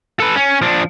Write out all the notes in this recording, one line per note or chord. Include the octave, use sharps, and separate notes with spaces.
A4 B4
C#4
F3 D4